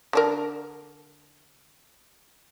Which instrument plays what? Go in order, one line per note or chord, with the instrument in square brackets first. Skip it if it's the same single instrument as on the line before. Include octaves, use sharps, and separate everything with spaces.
[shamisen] D3 D4 A#4